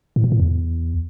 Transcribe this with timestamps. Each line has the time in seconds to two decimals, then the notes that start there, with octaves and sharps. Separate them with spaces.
0.16 A2
0.24 A#2
0.32 A2
0.40 E2